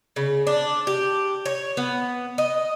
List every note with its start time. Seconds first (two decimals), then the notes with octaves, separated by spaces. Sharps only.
0.16 C#3
0.47 D4
0.87 G4
1.46 C#5
1.77 B3
2.38 D#5